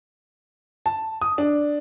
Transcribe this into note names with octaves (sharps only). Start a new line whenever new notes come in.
A5
D#6
D4